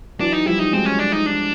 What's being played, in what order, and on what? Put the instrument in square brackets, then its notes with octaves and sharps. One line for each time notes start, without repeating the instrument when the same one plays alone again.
[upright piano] E3 F#3 [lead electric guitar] D4
[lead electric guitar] D#4
[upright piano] F3 G3 [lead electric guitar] E4
[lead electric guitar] D#4
[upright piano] F#3 G#3 [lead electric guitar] C4
[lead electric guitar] C#4
D4
D#4
D4